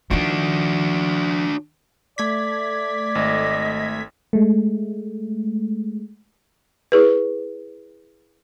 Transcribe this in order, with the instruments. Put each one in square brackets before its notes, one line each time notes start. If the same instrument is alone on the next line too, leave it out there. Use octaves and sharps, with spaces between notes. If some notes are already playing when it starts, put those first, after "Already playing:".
[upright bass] D#3 F3 [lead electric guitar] D4 F#4
[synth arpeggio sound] A3 G#6 B6 [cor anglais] D5
[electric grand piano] G#1 [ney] D#5
[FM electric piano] G#3 A3
[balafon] E4 G#4 B4